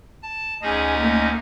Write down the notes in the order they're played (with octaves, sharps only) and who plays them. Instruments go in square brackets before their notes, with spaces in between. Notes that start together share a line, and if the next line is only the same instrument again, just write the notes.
[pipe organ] A5
[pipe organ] D2 C#4 D#4 [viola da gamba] G#4 [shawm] D#5
[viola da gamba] A3 A#3